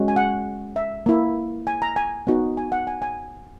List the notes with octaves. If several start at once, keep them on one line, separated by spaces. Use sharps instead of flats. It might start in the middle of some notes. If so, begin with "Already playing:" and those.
Already playing: G#3 C#4 F#4
G#5
F#5
E5
A#3 E4
G#5
A#5
G#5
B3 D#4 F#4
G#5
F#5
G#5
G#5